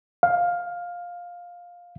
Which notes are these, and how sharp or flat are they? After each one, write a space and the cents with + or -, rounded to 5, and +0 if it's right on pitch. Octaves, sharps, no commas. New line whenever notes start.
F5 +10